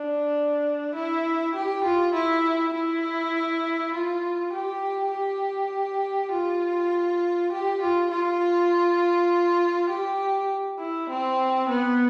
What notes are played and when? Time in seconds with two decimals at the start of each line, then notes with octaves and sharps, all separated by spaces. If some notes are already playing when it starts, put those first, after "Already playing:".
Already playing: D4
0.95 E4
1.55 G4
1.84 F4
2.14 E4
2.74 E4
3.94 F4
4.53 G4
5.12 G4
6.32 F4
7.52 G4
7.81 F4
8.11 F4
9.90 G4
10.79 E4
11.10 C4
11.69 B3